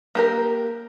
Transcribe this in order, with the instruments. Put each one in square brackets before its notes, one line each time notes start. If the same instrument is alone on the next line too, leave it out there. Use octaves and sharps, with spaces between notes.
[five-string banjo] A#3 G4 A#4